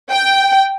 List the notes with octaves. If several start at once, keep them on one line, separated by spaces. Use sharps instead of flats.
G5